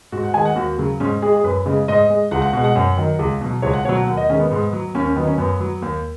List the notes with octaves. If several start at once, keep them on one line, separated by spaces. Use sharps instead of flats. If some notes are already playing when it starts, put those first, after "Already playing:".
G#2 F#4
F#5
D#3 G#3 G#5
F#5
D#2 F#4
C#3 F#3
G#2 C#4
G#3 G#4
G#4
F#2 B4
C#3 G#3
G#2 D#5
G#3
C#2 F#5
F#5
B2 G#3 F#5
F#5
F#2
D#3 F#3
C#2
B2 F#3
C#2 C#5
F#5
B2 F#3 C#5
F#5
D#2 F#5
D#5
D#3 G#3 C#4
B3
G#2
F#3
D#2 C#4
C#4
D#3 F#3 B3
C#4
F#2 B3
F#3
D#2